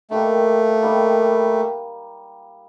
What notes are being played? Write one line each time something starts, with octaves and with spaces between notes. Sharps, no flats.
D#3 G3 A3 A#3
D#3 G3 A#3